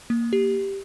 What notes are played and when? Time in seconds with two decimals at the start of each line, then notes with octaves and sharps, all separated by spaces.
0.10 A#3
0.33 G4